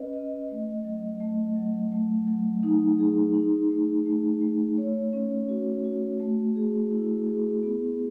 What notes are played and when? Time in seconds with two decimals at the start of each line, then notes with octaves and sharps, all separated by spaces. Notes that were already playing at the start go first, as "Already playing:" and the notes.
Already playing: C#4 B4 D#5
0.13 D#5
0.49 A3
0.84 F#3
1.20 A3
1.56 F#3
1.92 A3
2.27 F#3
2.63 D#4
2.99 G#4
3.34 D#4
3.70 A3
4.06 A3
4.41 A3
4.77 C#5
5.13 C#4
5.49 F#4
5.84 F#4
6.20 A3
6.55 G#4
6.91 E4
7.27 G#4
7.63 B3